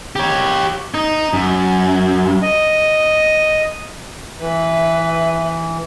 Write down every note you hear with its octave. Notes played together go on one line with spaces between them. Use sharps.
G4 C#5
D#4
F#2
D#5
E3 B4 E5